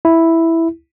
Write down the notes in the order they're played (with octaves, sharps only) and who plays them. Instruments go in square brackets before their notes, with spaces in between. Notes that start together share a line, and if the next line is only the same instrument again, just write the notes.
[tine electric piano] E4